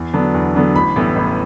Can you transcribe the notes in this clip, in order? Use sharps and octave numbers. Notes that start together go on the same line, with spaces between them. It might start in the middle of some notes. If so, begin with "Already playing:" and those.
Already playing: E2
D3 F#3 B3 D4
E2
D3 F#3 B3 D4
A1 B5
A2 E3 G3 B3
A1